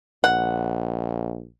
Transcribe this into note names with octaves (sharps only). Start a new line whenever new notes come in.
A#1 F#5